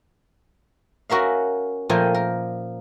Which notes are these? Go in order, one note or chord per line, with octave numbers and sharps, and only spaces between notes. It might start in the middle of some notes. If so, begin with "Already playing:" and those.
C#4 F#4 A#4 E5 F5
A#2 F3 A3 A#4 G5 G#5
A#4